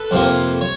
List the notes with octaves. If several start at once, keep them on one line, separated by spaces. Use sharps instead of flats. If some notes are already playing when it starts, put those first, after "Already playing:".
Already playing: A4 B4
F2 C3 F3 A#3
C#5